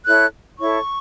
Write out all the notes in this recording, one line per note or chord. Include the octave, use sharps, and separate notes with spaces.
E4 A4 C#5 F#6
E4 A4 C#5 C#6